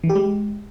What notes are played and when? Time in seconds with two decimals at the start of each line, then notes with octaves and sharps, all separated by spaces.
0.04 E3
0.09 G4
0.15 G#3